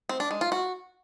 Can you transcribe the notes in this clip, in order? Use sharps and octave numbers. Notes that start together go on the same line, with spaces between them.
C4
D4
G#3
F4
F#4